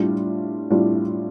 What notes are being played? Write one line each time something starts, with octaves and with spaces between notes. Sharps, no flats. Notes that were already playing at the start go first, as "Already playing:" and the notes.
Already playing: A2 G3 D4 F4
A2 G3 D4 F4